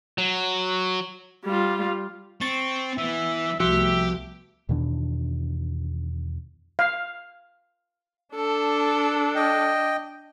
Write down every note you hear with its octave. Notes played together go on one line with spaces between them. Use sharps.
F#3
G3 F4
C4 C#6 A6
E3 B3 E5
C2 F3 A3 B3 F#4 G4 E5
E2 B2 D#3 D4
F5
D4 A4
D#5 G5